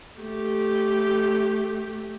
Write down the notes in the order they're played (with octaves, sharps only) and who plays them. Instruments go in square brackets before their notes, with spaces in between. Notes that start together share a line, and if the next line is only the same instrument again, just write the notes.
[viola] A3 G4